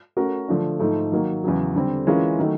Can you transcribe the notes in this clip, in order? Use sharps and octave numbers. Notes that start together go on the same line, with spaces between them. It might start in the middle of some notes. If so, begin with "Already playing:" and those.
A3 C#4 F#4 A#4
D3 F3 A3 D4
G#2 F3 A3
D#3 F#3 A#3
E2 C#3 F#3
D3 G3 C4
E3 G#3 C#4 F4 A#4
D#3 F#3 A3